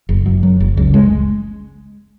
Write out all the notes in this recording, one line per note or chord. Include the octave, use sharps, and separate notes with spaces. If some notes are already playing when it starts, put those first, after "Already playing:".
F#1
F#2
F#3
F#1
C#2
G#3